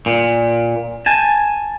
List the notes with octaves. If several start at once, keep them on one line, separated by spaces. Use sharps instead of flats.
A#2
G#5 A5